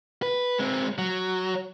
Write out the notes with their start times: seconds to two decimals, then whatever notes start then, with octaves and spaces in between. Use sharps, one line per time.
0.23 B4
0.58 G#3 C4
0.98 F#3